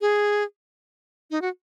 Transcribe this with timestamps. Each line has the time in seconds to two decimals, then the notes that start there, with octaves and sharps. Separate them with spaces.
0.01 G#4
1.31 D#4
1.42 F#4